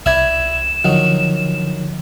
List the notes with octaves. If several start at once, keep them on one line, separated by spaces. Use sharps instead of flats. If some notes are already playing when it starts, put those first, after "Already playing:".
C2 E4 D5 E5 G#6 E7
D3 D#3 F3 F#3